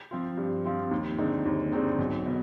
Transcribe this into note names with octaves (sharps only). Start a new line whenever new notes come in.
F3 C4 F4
G2
F3 C4 F4
D#2
D3 G#3 C4 D#4
D#2
D3 G#3 C4 D#4
B1
B2 B3